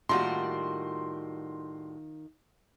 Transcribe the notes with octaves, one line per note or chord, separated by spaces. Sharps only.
A2 D#3 G3 A#3 F4 F#4 C6